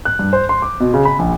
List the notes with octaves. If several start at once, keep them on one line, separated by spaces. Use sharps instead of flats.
F#6
G2
C5
C6
D6
B2
C#3
B5
A#1